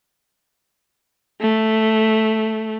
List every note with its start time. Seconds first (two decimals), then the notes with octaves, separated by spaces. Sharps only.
1.41 A3